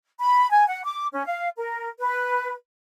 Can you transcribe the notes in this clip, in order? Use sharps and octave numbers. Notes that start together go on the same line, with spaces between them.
B5
G#5
F#5
D6
C#4
F5
A#4
B4